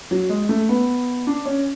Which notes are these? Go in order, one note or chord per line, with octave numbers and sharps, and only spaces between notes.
F#3
G#3
A3
B3
D4
C#4